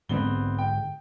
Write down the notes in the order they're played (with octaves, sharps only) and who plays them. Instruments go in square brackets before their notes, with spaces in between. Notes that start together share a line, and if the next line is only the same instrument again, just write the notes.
[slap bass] G#2 D3 G#3 [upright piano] B3 C4 G7
[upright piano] G5